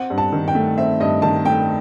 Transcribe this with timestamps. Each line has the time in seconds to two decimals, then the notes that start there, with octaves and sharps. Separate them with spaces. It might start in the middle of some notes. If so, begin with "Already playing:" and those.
Already playing: C4 F#5
0.10 G2
0.18 A5
0.33 D#3
0.48 G5
0.55 A3
0.78 C4 E5
1.00 G2 D#5
1.22 D#3 A5
1.45 A3 G5